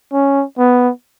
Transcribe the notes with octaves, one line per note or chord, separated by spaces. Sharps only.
C#4
B3